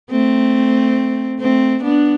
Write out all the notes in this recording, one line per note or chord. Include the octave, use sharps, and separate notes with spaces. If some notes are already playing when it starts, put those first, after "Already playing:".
A3 C4
A3 C4
B3 D4